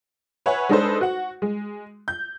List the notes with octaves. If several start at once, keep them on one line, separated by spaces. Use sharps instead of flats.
B4 C#5 E5 F#5 G#5
G#3 D4 D#4 A4 B4 C5
F#4 F#5
G#3
G6